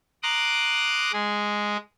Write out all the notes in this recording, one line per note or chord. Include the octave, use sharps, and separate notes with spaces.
A#5 C6 D6 D#6 F#6
G#3 G#4